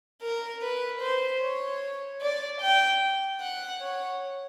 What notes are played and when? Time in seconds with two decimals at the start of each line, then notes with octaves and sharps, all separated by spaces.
0.21 A#4
0.62 B4
1.01 C5
1.41 C#5
2.21 D5
2.61 G5
3.40 F#5
3.80 C#5